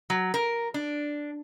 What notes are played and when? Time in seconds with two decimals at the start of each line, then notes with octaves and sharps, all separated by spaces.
0.10 F#3
0.34 A#4
0.74 D4